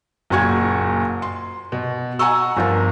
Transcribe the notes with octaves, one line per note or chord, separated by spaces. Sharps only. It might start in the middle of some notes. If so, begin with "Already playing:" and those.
F#1 A#2 F#4 C#6 G#6
C6
B2
F#5 G#5 A#5 C#6 E6
G1 F3 A#4